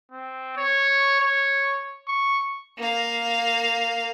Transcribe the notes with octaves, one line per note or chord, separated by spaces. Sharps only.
C4
C#5
C#5
C#6
A#3 F5